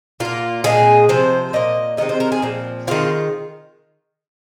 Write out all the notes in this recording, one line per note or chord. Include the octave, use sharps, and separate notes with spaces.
A#2 A#3 F4
A#2 G#3 C4 G#4
C3 F3 C4 C5
A#2 A#3 D#5
C3 D#3 G#3 C4 D#5
C5
A#4
G#4
A#2 F3 C4
D#3 G#3 C4 F4